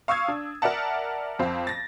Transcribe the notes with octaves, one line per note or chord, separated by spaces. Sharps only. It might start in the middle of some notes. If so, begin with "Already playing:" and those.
F5 C#6 D#6 E6 G#6
D4
A#4 D5 E5 F#5 A5
F2 C4 F5
A6 A#6